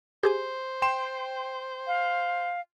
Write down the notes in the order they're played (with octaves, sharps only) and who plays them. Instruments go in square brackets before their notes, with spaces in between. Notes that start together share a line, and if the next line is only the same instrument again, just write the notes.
[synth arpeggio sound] G4 G#4 G#5 [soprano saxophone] C5
[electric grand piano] G5 C6 E7
[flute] F5